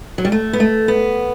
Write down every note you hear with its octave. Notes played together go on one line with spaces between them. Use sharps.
F#3
G3
A3
B3
A3
B3